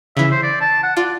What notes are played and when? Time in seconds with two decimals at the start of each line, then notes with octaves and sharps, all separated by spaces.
0.17 C#3 E3 E5
0.31 C5
0.43 D5
0.61 A5
0.83 F#5
0.97 F4 D5